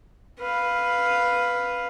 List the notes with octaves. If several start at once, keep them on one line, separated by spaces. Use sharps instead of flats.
B4 F5